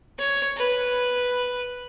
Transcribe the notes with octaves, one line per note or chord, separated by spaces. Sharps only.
C#5
B4